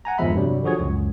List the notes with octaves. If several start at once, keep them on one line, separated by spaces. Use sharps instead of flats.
F#5 G#5 A#5
G1 E2 F3 G#3 E5 B5
G2 C3 F#3 G3
D3 F3 F#4 G#4 C#5
C#2 F#2